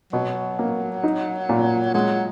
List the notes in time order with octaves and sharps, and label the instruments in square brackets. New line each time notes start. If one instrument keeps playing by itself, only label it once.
[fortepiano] B2 [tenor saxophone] F#3
[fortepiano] A#3
D#4
A#2
[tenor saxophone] F#3 [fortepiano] G#3